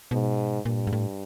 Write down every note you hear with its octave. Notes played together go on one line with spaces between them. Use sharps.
G#2 B2
G2 A#2
G#2
A2